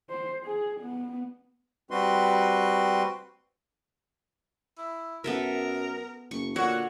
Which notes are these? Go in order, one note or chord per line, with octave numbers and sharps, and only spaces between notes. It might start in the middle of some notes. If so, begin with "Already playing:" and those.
C5
G#4
B3
G3 C4 F#4 B4 C6
E4
F#2 B3 A4 A#4 E5
F#1 C#6
A#2 D3 F#4 C#5